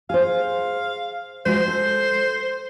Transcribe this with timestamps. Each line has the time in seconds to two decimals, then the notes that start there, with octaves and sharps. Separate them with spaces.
0.10 G#4 C5 F5
1.46 G#3 F#4 C5 D#5
1.68 A4